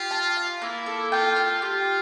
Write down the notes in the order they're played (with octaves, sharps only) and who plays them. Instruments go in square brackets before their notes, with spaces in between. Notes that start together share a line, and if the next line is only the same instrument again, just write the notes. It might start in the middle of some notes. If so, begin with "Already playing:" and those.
Already playing: [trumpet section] F4 [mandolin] G4
[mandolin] A5
F5
[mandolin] A#3 [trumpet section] E4
[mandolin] A4
[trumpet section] F4 [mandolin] G5
[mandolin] G5
[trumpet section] F4 [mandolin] G4